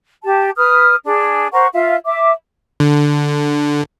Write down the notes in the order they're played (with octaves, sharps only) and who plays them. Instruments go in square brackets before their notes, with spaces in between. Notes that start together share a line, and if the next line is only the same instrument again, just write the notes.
[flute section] G4 A5
B4 D#6 F6
D4 G#4
A#4 C5 F#5 C#6
F4 E5 F5
E5 D6
[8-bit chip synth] D3